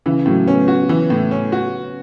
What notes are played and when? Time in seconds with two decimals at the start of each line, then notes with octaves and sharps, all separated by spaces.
0.06 C#3 E3
0.26 A2 F#3
0.47 B3 C#4
0.68 F#4
0.89 E3
1.10 A2
1.31 C#4
1.52 F#4